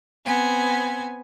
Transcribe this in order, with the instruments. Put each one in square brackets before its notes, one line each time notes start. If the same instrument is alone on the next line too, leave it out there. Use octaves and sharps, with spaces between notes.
[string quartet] B3 C4 G#5